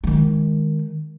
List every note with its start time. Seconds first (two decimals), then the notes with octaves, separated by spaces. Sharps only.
0.04 D#3 G#3